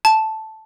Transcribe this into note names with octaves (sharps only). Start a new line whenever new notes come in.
A5